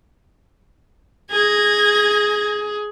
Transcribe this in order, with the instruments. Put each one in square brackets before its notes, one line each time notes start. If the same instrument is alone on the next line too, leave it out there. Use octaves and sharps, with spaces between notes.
[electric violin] G#4 [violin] G#6 A#6